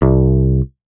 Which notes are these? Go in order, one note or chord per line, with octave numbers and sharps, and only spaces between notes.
C2